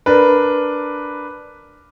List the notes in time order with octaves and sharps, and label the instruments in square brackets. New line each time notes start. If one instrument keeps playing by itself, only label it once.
[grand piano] D4 A#4 B4